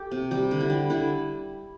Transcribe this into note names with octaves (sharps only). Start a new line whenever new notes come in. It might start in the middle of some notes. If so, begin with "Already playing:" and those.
Already playing: G4 A4
C3
G3 G4
D3
E4
G3
D3 E4